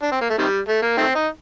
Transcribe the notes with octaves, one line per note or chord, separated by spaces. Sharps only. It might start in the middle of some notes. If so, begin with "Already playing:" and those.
D4
C4
A#3
A3
C3 D#3 G3
A3
A#3
D#3 A3 C4
D#4